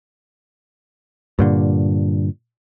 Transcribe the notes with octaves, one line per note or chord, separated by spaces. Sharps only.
G2 A#2 D3